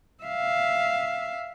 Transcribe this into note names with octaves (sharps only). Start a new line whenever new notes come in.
E5 F5